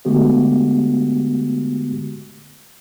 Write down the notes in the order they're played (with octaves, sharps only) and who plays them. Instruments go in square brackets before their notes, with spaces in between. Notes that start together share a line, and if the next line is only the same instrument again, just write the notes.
[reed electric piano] D3 G#3 A3 B3 F#4 G4